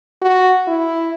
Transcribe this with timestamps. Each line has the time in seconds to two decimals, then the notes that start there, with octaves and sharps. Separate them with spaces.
0.22 F#4
0.67 E4